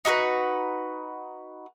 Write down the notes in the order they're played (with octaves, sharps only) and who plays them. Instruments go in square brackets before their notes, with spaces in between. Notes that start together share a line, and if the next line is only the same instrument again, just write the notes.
[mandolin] D#4 F#4 A4 B4